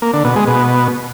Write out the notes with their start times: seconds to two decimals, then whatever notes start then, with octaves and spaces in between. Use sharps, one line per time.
0.02 A#3
0.13 D3
0.25 B2
0.36 G#3
0.47 B2